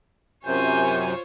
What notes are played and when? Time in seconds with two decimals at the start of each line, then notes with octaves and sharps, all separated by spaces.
0.45 F#2 C3 F4 C5 C#5 G#5 G6